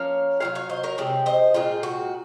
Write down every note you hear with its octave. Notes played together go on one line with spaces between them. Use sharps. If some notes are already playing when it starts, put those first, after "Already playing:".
Already playing: F3 A#3 C#4 C#5 F5
F#3 C4 F4 C#5 F5
C#5 F5
C5 D#5
A#4 C#5
C3 F3 G#3 C4
C5 D#5
A#2 G#3 C4 F4 G#4
F#4